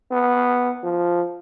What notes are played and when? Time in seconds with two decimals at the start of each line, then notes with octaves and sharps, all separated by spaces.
0.11 B3
0.84 F3